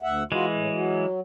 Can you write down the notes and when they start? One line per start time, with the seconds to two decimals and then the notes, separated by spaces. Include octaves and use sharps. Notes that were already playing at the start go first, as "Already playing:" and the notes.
0.02 D2 E5 F#5
0.32 E3 G#3 F4 F#4
0.54 A2
0.70 F#3